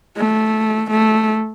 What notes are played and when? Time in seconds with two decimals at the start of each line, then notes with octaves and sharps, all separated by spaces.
0.17 A3
0.91 A3